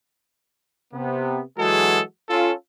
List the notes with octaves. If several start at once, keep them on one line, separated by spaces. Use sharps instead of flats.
C3 B3
E3 F#3 G#3 F#4 G#4 A4
C#4 F4 A4